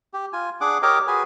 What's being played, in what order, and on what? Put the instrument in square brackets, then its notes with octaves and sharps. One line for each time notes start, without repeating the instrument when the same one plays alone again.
[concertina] G4
F4 G#5
D4 G#4 F#5 D6
G4 A#4 C#5 D#5 D6
F#4 G#4 B4 G#5